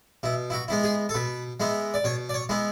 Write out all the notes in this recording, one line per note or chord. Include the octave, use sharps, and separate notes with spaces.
B2 E4
E4
F#4
G#3 B3 E4
G#4
A4
B2 B4
G#3 B3 E4
D5
B2 C#5
D5
C#5
G#3 B3 E4